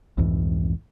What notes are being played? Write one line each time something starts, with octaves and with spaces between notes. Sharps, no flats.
C2 F2 G#2 E3